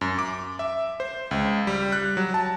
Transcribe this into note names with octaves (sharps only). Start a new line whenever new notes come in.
F#2
D6
E5
C5
C#2
G3
F#6
F#3
A5